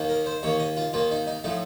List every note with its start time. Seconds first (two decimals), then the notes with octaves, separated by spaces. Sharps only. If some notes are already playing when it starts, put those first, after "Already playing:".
Already playing: D#2 D#3 A#3
0.09 A#4
0.26 C5
0.43 D#2 D#3 A#3 C#5
0.60 D#5
0.77 F4
0.93 D#2 D#3 A#3 F4
1.11 D#4
1.27 D#4
1.44 A2 F3 A3 D#4